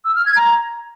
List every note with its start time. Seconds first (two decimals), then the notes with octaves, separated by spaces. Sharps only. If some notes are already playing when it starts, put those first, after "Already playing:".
0.05 E6
0.15 F6
0.26 G#6
0.36 A#5